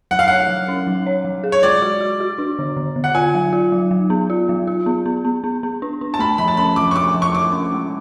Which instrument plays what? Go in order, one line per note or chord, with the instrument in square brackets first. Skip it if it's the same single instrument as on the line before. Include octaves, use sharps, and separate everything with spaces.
[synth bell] F#3 [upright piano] F#5
[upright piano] F5
[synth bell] C#5 [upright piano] F#5
[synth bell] F#3
C#4
F#3
C#5
F#3
G#4
[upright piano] C#5
[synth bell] G#3 [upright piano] D5
[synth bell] F#4
F#4
F#4
D4
D3
D3
D3
[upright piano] F#5
[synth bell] F4 [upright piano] G#5
[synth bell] F#3
F4
F#3
F#3
B3
F4
F#3
F4
B3
B3
B3
B3
B3
D4
D4
[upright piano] A5
[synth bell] A3 [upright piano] B5
[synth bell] F3 [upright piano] B5
[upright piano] A5
[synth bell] C#4 [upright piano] B5
[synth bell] F3 [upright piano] D6
[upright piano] C#6
[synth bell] A3 [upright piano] D6
[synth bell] F3
[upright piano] C#6
[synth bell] F3 [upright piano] D6
[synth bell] C#4
G#3